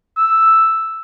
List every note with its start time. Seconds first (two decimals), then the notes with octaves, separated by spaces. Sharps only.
0.17 E6